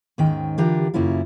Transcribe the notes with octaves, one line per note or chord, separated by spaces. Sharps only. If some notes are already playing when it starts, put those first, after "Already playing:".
D#2 G#2 D#3 C#4 G5
D3 E3 D4 F4 G4 A#4
F#2 C#3 A#3 C#4 E4 F4